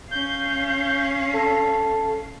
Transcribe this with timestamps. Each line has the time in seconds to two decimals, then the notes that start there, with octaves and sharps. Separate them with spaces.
0.11 C#4 F5 G6
1.33 A4